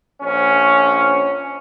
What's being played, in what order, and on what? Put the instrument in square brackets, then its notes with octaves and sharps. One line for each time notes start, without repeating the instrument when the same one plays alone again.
[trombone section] A#1 C#4